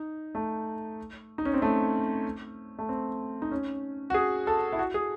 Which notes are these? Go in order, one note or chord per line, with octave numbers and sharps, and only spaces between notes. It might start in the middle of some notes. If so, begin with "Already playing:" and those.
Already playing: D#4
A3
D#4
C#4
C4
A3
A3
C4
D#4
C#4
F#4
G#4
A4
E4
F#4
G#4